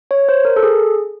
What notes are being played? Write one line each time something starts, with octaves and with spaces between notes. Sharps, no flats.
C#5
C5
A#4
A4
G#4